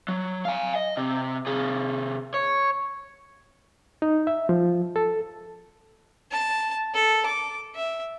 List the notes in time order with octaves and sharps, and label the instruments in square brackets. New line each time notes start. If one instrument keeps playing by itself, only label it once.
[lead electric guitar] F#3
F5 G#5
D#5
C3
C3 G#4
C#5
[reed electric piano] D#4
E5
F3
A4
[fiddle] A5
A4
D6
E5